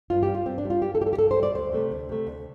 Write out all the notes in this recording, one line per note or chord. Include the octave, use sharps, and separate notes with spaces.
G2 F4
G4
G3
F4
G2 C4
D4
G3
F4
G2 G4
A4
G3 G4
A4
G4
G2 A4
C5
G3
D5
D2 C5
C3 A3
D2
C3 A3
D2